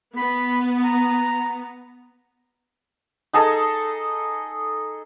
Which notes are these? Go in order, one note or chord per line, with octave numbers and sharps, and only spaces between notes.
B3 B5
A#5
D#4 G#4 A4 D#5